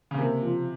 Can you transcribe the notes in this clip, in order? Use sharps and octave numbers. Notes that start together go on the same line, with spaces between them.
C#3
C3 A#3
F3